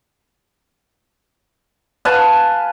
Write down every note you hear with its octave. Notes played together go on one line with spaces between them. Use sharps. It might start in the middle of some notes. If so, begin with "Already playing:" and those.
B4 F5 G#5 A5